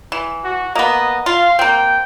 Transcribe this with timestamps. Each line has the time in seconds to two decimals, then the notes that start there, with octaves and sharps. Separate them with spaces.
0.12 E3
0.44 F#4
0.75 A#3 B3 D#5
1.26 F4 F5
1.59 A#3 C4 G5